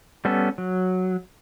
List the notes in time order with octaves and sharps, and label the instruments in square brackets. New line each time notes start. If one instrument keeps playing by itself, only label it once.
[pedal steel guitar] G3 B3 C#4 A4
F#3